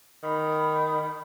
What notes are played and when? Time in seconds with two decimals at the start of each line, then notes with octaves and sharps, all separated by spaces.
0.23 D#3 B5